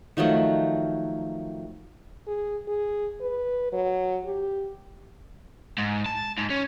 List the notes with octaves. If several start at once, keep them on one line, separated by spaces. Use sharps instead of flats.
D#3 F3 F#3 A3
G#4
G#4
B4
F#3
G4
G#2
A5
G#2
C#4